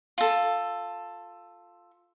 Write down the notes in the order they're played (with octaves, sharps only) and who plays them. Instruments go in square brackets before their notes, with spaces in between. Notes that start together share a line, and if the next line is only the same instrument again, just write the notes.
[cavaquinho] F4 A4